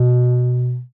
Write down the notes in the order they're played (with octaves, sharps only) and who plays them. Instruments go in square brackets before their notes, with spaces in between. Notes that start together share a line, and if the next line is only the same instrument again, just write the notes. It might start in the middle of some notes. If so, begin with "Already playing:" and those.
Already playing: [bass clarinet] B2